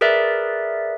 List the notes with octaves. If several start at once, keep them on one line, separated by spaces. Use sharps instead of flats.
G#4 A#4 B4 D5 E5